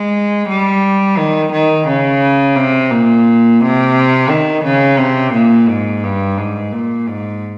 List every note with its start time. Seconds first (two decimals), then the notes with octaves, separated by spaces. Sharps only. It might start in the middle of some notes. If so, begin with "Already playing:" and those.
Already playing: G#3
0.48 G3
1.17 D#3
1.52 D#3
1.86 C#3
2.56 C3
2.90 A#2
3.60 C3
4.29 D#3
4.64 C#3
4.98 C3
5.33 A#2
5.69 G#2
6.03 G2
6.37 G#2
6.72 A#2
7.07 G#2